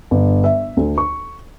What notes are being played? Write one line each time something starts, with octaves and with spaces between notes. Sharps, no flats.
G1
E5
D2
C#6